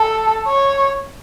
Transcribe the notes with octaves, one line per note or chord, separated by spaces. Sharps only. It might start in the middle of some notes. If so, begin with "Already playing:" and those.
Already playing: A4
C#5